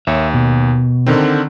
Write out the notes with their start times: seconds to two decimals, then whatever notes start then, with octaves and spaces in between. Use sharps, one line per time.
0.07 D#2 C#5 E5
0.34 B2
1.06 D3 D#3 C4